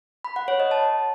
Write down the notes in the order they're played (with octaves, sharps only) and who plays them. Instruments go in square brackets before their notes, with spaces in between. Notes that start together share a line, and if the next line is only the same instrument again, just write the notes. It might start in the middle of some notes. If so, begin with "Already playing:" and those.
[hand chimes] B5
F#5
C#5
D#5
A5